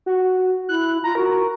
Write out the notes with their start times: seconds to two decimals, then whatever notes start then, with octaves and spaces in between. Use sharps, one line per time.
0.06 F#4
0.69 E4 F#6
1.04 F4 A#5
1.15 F#4 A#4